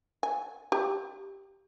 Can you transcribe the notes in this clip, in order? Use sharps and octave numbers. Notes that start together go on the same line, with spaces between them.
G#5
G4